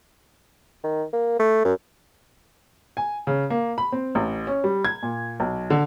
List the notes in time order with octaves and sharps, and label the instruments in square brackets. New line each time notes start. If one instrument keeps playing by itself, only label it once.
[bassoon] D#3
A#3
A3
F#2
[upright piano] G#5
C#3
A#3
B5
C4
A1
C#4
G3
G#6
A#2
B1
D3